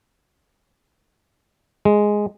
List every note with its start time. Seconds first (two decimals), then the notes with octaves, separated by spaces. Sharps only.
1.85 G#3